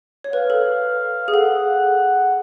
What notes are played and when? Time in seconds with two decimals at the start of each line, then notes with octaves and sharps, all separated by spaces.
0.24 C#5
0.32 B4 F5
0.50 A4
1.28 G#4
1.34 A4 F#5